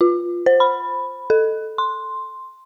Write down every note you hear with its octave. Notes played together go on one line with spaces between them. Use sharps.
F4
C5
B5
A4
C6